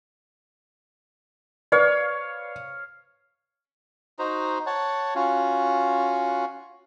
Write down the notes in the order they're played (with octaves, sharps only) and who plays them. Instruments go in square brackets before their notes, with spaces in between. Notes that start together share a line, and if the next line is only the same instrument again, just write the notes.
[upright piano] B4 D5 [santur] C#5 F5
[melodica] D#4 F#4 C5 A#5
C#5 F#5 A5
C#4 F4 F#4